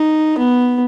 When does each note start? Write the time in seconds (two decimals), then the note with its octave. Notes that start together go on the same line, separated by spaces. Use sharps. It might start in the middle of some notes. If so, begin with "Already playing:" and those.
Already playing: D#4
0.38 B3